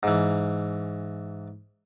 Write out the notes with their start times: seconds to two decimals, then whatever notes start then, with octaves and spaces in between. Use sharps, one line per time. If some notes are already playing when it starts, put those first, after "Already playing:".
0.03 G#2 E3